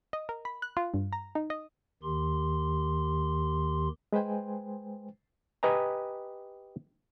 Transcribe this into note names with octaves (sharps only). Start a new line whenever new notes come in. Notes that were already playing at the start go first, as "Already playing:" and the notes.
D#5
A#4
B5
F#6
F4
G2
A#5
D#4
D#5
D#2 D#3 G4 C6
G#3 B4 C5 G5 G#5
G4 B4 D#5 G#5 A#5